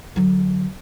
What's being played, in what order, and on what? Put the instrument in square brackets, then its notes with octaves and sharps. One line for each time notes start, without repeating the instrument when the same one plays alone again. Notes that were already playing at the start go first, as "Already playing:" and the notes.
[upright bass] D3 F#3